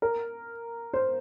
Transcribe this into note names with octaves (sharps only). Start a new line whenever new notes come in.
A#4
C5